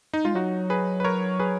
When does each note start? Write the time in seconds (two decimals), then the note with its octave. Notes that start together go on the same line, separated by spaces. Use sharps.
0.14 D#4
0.25 G#3 F4
0.35 F#3 D#4 F#4
0.70 G#4 B4
1.00 B4
1.04 A#4 C#5
1.40 G#4 B4